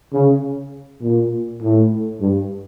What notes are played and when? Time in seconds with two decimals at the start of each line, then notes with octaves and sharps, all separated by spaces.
0.13 C#3
1.01 A#2
1.62 A2
2.21 G2